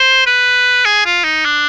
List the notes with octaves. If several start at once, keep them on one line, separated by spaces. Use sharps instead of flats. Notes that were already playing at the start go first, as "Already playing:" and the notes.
Already playing: C5
B4
G#4
F4
D#4
D4